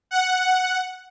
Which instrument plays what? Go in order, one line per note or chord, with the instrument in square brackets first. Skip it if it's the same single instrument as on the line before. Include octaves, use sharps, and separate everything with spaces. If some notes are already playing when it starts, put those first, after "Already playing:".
[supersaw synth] F#5